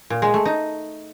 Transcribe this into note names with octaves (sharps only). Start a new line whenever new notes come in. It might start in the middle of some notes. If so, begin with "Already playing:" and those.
A#2
G#3
A3
D#4